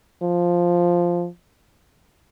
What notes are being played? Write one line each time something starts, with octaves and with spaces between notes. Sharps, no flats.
F3